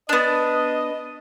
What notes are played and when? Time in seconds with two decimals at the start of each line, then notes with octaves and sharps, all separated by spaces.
0.09 B3 D4 D#5